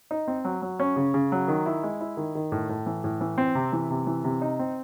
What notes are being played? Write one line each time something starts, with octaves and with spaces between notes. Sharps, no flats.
D#4
C4
F#3
F#3
C#4
C#3
C#3
F#3
D#3
E4
G#3
E4
D#3
D#3
A2
A2
E3
A2
E3
C4
C3
E3
C3
E3
C3
D#4
C4